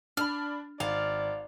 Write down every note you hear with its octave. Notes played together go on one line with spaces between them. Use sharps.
D4 B5 F6
G#1 D5 F5